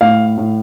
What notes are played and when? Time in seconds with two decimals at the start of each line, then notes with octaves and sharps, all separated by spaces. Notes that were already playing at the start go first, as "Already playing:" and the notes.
0.01 A2 F5
0.37 A2